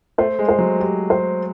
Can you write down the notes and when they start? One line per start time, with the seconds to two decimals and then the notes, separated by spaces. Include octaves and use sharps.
0.18 A3 C5
0.39 G#3
0.49 C5
0.59 F#3
0.80 G4
1.10 C5